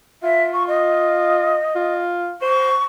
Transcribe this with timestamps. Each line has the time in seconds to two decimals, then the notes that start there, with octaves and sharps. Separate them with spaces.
0.23 F4 E5
0.54 C#6
0.68 D#5
1.75 F4
2.42 C5 C#6